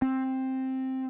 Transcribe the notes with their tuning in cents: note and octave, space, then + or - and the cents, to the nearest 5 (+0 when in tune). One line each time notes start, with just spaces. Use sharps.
C4 +5